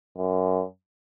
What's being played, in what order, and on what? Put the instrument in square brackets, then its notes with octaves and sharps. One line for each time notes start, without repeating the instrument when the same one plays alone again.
[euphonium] F#2